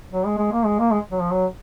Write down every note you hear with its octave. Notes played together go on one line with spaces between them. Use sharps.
F#3
G#3
G#3
A#3
G#3
A#3
G#3
F#3
F3
F#3